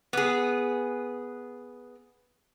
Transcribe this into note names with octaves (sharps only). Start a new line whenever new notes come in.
B3 G#4